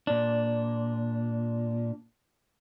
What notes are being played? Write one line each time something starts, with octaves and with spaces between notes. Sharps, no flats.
A#2 D4